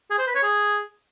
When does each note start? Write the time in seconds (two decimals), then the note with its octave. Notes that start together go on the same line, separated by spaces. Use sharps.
0.10 G#4
0.19 C5
0.27 B4
0.35 C#5
0.43 G#4